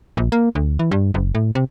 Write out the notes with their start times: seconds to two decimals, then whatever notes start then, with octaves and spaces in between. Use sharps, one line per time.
0.17 A#1
0.32 A#3
0.55 D2
0.79 E3
0.91 G2
1.14 F#1
1.35 A2
1.55 C3